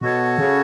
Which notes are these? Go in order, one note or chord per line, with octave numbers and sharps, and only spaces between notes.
B2 F#4 A4 C#5 A5
C#3